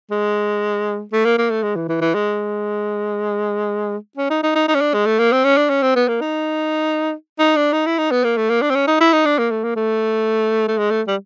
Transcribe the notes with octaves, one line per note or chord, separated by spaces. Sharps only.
G#3
A3
A#3
A#3
A3
G#3
E3
E3
E3
G#3
C#4
D#4
D#4
D#4
D#4
C#4
D4
G#3
A3
A#3
C4
C#4
D4
C#4
C4
B3
A#3
D#4
D#4
D4
D#4
E4
D#4
B3
A#3
A3
A#3
D4
C4
C#4
D#4
E4
D#4
D4
A#3
A3
A#3
A3
A3
G#3
A3
G3